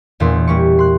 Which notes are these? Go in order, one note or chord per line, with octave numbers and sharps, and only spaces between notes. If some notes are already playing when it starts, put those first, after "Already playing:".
E1 E2 A#2 A#3 C6
G3 A#3 C#6
C6 F#6